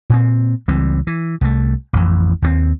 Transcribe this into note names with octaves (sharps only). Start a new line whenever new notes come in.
A#2 C4
C#2 E3 G3 C4
E3
C2 F3 A3
A1 F2 E3
D#2 G3 C4